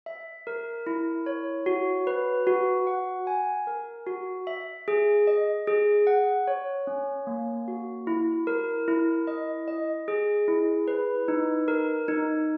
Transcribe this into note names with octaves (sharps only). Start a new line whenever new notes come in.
E5
A#4
E4
C#5
F#4
B4
F#4
F#5
G#5
A#4
F#4
E5
G#4
D#5
G#4
F#5
C#5
C#4
A#3
F#4
E4
A#4
E4
D#5
D#5
G#4
E4
B4
D#4
A#4
D#4